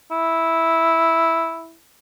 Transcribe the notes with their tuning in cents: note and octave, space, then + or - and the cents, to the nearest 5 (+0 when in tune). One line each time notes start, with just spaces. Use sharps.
E4 -5